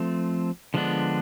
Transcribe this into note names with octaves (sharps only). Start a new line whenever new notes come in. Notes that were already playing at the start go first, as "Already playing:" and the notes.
Already playing: F3 A3 C4
D3 F3 G#3 B3 D4